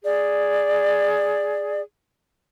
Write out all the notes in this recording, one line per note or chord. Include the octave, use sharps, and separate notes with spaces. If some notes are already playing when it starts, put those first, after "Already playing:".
G#4 D5